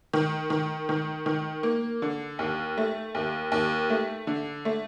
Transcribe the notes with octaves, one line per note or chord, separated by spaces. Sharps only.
D#3
D#3
D#3
D#3
A#3
D3
D#2
A3
D#2
D#2
A3
D3
A3